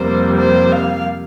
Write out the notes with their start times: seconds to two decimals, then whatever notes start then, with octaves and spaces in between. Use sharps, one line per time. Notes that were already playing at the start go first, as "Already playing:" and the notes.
Already playing: F2 C3 G3 A#3 C5
0.37 C5
0.72 F5